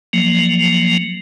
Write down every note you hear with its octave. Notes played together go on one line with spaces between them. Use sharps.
F3 F#3 A#3